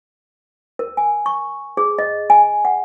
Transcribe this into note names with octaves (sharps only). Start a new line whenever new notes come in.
A#4
G#5
C#6
G#4
D#5
G#5
F#5